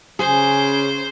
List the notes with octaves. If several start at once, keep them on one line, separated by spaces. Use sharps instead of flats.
C#3 G#4 C5